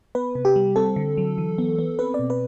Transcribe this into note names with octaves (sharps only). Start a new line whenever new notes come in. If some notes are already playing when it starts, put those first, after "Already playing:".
B3 B4
C3
G4
G3
C4 A4
D3
F#3
E3
B3
B3
C4 B4
D5
B2
B4